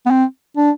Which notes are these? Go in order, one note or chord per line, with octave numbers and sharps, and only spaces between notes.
B3
C4
D4